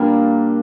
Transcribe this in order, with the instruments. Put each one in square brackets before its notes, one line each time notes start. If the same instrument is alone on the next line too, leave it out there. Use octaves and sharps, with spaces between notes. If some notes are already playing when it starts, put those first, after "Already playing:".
Already playing: [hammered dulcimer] A#2 G3 A#3 D4